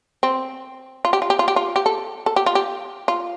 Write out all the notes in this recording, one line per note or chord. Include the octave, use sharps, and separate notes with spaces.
C4
F4
G4
F4
G4
F4
G4
F4
G4
A4
A4
G4
F4
G4
F4